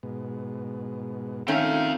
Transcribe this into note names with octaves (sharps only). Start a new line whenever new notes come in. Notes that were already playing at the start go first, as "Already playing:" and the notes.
G#2 B2
D#3 A3 C4 C#4 F5